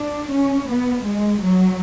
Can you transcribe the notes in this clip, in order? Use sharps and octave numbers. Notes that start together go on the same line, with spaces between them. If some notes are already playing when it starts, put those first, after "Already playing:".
Already playing: D4
C#4
B3
G#3
F#3